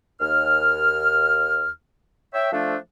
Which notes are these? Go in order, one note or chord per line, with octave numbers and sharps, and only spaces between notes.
D#2 F6
C#5 E5 G5
F3 A3 D4